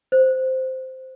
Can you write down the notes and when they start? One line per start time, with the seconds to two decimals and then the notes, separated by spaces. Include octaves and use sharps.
0.12 C5